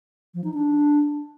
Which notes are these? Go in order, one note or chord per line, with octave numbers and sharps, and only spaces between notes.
F3
D#4
D4